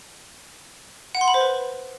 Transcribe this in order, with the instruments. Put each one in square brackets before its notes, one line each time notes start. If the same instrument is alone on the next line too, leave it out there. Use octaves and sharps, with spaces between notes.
[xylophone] F#5
C6
B5
C5
B4